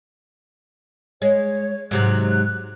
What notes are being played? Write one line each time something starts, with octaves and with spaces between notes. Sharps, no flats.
G#3 C#5
G#2 C3 F#3 F#6